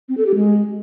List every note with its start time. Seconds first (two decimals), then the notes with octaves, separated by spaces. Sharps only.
0.09 C4
0.17 A4
0.26 G4
0.35 G#3